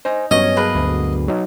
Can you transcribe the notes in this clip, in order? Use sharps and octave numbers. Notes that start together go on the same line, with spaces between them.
D#4 C5 G#5
G2 F#3 B3 C#4 D#5
A#3 G#4 B4
D2
F#3 D#4